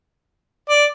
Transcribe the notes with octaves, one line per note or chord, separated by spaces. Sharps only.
D5